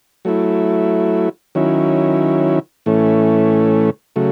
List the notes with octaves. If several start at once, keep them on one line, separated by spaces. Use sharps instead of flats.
F#3 A3 E4
D#3 F#3 C#4 E4
A2 E3 A3 C#4
C#3 F#3 A3